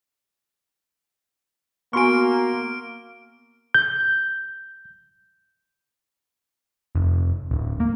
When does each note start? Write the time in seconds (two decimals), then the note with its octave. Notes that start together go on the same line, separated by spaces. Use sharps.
1.93 A#3 B3 F#4 G#5 C6 C#6 F6 D7
3.74 G6
6.95 F1
7.51 D1
7.80 A#3